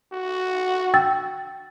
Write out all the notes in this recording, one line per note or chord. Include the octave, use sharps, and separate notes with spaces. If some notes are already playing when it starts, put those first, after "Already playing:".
F#4
G5 E6 A6